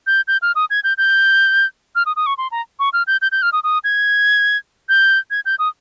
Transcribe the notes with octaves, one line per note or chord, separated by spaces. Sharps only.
G6
G6
F6
D#6
G#6
G6
G6
F6
D#6
D#6
C#6
C6
A#5
C#6
F6
G6
G6
G6
F6
D#6
D#6
G#6
G6
G#6
G6
D#6